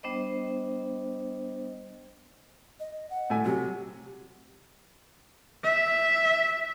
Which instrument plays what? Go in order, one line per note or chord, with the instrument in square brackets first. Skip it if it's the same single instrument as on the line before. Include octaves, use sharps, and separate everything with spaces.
[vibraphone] G3 B3 D4 C5 D#5
[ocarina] D#5
F#5
[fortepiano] A2 A3 G#5
[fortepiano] C3 F#3 [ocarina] G4
[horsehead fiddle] E5